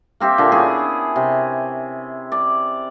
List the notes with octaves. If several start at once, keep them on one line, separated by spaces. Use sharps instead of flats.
A#3 C4 G4 E5
A#2 D3
B3 C#4 E4 G#4
C3
D5